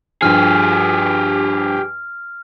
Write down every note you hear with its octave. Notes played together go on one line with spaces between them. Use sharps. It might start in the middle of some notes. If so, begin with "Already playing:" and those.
G2 F3 G4 G#4 F6